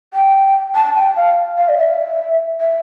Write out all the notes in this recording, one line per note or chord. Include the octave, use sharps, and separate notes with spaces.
G5
A5
G5
F5
F5
D5
E5
E5